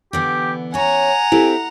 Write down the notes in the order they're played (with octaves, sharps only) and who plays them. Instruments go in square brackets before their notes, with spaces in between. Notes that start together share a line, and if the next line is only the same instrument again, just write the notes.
[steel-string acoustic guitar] D3 E3 B3 [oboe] G4
[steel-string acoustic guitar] C#4 C#5 [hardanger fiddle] F#5 A#5 [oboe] G#5
[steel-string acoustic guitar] C4 [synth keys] E4 G4 A4